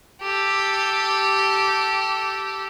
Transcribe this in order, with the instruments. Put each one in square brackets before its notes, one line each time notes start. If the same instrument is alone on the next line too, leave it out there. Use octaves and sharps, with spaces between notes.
[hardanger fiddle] G4 A4